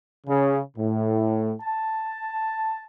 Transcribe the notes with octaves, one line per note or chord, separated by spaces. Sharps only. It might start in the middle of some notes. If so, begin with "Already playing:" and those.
C#3
A2
A5